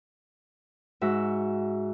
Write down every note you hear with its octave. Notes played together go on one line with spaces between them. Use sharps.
G#2 F#4 E5